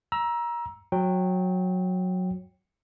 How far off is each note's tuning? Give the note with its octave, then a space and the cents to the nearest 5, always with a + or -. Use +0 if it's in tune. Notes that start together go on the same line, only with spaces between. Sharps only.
A#5 +25 E6 +0
F#3 -15 G5 +0